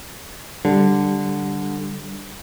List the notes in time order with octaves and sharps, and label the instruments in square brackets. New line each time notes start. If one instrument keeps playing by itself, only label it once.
[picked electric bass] D3 [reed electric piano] G3